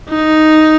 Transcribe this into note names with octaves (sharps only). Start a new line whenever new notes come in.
D#4